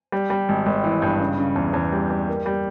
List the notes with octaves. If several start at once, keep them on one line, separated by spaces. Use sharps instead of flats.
G3
G3
G#1
G#1
E3
G2
C#3
C#3
E2
E2
G3
G3
A#3
G3